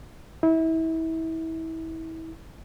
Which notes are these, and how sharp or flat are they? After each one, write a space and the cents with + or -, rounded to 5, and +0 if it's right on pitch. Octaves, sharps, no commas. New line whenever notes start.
E4 -30